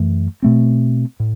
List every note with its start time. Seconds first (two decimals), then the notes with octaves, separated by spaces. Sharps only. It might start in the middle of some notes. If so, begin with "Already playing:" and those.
Already playing: F#2 E3 A3
0.42 B2 A3 C4
1.20 A2